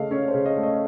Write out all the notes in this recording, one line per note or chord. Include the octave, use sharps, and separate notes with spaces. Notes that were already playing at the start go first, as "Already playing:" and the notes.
Already playing: C#3 A3 D#5 F5
C#4 C#5
C5
C#3
D#5
A3
D#5